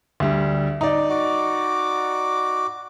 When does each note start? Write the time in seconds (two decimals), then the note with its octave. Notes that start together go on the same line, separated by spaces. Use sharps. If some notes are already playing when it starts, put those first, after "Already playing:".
0.20 D2 G3
0.81 D#4 D5
1.09 F#4 D6